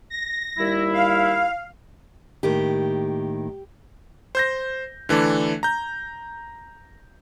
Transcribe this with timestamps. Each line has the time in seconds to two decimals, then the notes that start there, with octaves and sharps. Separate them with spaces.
0.10 A#6
0.59 D#2 G3 E4
0.93 F5
2.43 A2 D#3 A#3 G4
4.35 C5 G6 A#6
5.09 D3 E3 A3 D4
5.63 A#5 G6